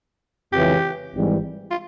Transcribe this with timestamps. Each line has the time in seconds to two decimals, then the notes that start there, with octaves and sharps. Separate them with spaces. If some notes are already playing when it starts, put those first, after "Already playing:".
0.53 F2 C#3 E3 G#3 G4
1.15 G#1 G#2 E3 G3
1.71 F4